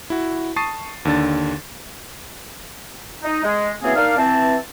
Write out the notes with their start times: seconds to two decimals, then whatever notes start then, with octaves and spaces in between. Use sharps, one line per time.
0.10 E4 F#4
0.56 A5 C#6 D#6 A6 C7 D#7
1.05 D#2 D3 D4 A6
3.23 D#4
3.44 G#3
3.83 E3 F#3 A#3 C4 C#4 G#4
3.95 A#3 D4 D#4 D5 F5
4.17 E3 C4 A5